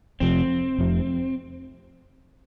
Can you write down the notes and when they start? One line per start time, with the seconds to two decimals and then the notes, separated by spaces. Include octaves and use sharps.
0.20 F1 F2 C3 C4
0.79 F1 F2 C3